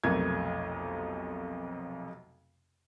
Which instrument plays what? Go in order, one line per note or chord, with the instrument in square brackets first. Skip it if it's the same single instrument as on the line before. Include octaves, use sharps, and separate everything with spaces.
[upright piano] B1 F2 C3 A3 A#4 G#6